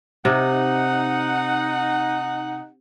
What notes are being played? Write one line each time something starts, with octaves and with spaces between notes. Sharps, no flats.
C3 D#4 F#5